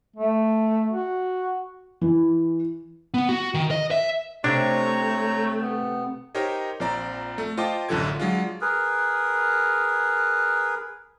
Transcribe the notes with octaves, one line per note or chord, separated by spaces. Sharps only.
A3
F#4
E3
B3
F#4
D#3
D#5
E5
C3 A3 D4 C#5 A#5 C#6
B3
D#4 G4 A#4 C5 C#5 D#5
A#1 F3 C4 D5 A#5
A3
F4 C5 D#5 G5 A5 D6
A1 F#2 D3 F3 A4 G#6
F#3 G#3 D4 F4
G#4 A#4 B4